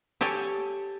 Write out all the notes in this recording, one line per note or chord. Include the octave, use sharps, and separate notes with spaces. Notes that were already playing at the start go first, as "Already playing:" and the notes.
G4 A4 C#5 G5 G#5